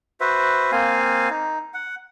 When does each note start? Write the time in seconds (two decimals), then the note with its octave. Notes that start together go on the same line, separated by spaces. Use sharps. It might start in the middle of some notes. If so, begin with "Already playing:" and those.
0.20 F#4 B4 C5 E5
0.72 A#3 C4 F5 G#5
1.30 D#4
1.74 F#5